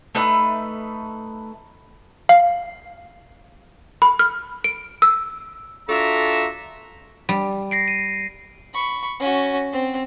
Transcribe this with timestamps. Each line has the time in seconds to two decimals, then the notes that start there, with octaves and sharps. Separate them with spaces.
0.15 A3 D#4 B4 E5
2.29 F5
4.02 B5
4.19 F6
4.64 D7
5.02 E6
5.89 D4 F4 F#4 A4 E5 A#5
7.29 G3
7.71 A#6 C7 D7
7.88 D#7
8.74 B5 C#6
9.20 C#4 F#4
9.73 C4